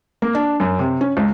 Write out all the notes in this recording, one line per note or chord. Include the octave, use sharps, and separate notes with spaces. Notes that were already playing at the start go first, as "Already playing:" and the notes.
A#3
D4
F#2
C3
C#4
C#2